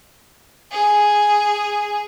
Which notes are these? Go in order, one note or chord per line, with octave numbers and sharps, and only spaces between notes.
G#4